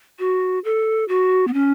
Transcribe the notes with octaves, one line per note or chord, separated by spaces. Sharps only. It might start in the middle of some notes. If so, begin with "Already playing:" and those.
F#4
A4
F#4
B3
C#4